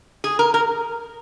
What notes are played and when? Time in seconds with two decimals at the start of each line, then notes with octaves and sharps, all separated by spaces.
0.24 G#4
0.39 A#4
0.54 A#4